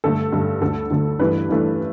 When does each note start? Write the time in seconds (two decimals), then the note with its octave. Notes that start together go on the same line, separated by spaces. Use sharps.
0.04 G2 D3 A3 A4
0.32 G2 D3 A3
0.61 D2 D3 A3 A4
0.90 D2 D3 A3
1.19 G2 E3 A3 D4 B4
1.49 G2 E3 A3 D4